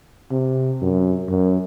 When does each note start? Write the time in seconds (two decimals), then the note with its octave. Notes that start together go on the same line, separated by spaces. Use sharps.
0.31 C3
0.82 F#2
1.29 F#2